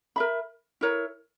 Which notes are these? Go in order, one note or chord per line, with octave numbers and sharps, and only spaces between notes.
A#4 E5 B5
E4 A#4 C#5